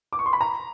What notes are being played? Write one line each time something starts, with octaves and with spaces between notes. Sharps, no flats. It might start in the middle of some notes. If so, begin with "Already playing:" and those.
D6
C#6
C6
B5
A#5